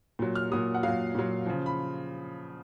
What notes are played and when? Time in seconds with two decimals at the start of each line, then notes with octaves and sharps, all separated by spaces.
0.19 A#2 F#3
0.35 F6
0.52 A#2 F#3 D#6
0.74 F#5
0.83 A#2 F#3 F5
1.15 A#2 F#3
1.46 C#3 F3
1.66 B5